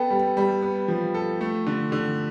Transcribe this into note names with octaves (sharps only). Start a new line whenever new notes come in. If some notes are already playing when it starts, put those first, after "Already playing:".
Already playing: B3 A4 G5
G3
G3
B3
F3
A4
A3
D3
D3